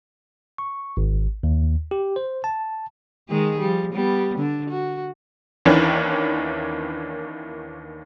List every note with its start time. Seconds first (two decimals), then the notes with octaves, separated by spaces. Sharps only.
0.58 C#6
0.97 G#1
1.43 D#2
1.91 G4
2.16 C5
2.44 A5
3.29 D#3 G#3 G#4
3.59 F3 G3
3.93 G3 B3
4.38 D3 D4
4.70 F#4
5.65 D#2 D#3 E3 C#4 D4